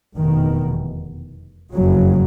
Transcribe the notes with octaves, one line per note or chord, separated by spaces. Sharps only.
F1 E2 B2 D#3
F#1 F2 C#3 F#3